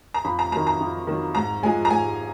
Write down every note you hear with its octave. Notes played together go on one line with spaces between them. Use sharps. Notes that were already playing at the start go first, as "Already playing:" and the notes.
A#5
F2 B5
A#5
D#3 F#3 A#5
A#5
F2
D#3 F#3
G#2 A#5
F3 G#3 G#5
A#5
G#2 G#5